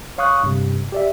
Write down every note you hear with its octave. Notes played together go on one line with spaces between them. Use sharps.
C#5 F5 C#6 D#6 F#6
G2 C3
G4 D5 E5